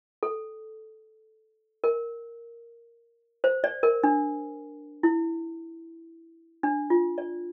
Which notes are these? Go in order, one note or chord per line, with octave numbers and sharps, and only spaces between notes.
A4
A#4
C5
D5
A#4
D4
E4
D4
F4
D5